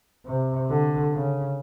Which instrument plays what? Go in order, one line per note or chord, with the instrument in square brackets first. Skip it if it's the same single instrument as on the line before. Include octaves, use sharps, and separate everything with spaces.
[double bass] C3
D3
C#3